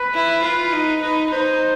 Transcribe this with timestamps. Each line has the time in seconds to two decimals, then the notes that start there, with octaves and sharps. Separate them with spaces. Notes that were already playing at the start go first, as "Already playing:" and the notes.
Already playing: B4
0.14 E4
0.44 F4 B4
0.73 D#4
1.02 D#4 B4
1.31 D#4 C5